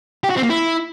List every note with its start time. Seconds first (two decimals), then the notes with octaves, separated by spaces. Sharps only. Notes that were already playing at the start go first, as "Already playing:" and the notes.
0.24 G4
0.30 F#4
0.37 C4
0.43 A#3
0.50 E4